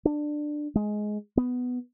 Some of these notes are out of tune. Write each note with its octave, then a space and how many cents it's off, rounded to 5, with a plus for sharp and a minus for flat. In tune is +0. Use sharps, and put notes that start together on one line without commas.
D4 +15
G#3 +15
B3 +10